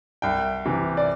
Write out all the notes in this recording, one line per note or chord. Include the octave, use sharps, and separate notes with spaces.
C2 G5
C3 E3
D5